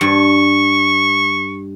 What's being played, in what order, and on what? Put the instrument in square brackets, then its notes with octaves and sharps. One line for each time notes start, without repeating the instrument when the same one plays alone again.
[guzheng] G2 [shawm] C#6